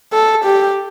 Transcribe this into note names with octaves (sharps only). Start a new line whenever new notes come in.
A4
G4